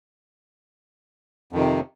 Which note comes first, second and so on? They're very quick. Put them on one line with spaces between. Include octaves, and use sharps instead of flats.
F2 D#3 C3